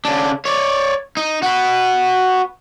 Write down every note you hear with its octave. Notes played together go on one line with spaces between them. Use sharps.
C#3 D4
C#5 D5
D#4
F#4 B4